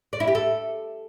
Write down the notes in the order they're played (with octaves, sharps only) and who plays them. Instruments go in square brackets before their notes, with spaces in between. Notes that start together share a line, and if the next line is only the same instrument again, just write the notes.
[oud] D5
E4
G4
A4